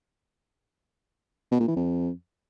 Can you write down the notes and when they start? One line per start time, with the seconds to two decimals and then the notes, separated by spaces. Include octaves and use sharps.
1.52 B2
1.60 A#2
1.68 E3
1.76 F2